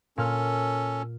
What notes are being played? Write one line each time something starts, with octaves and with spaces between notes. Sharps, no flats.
A#2 C#4 A4 F6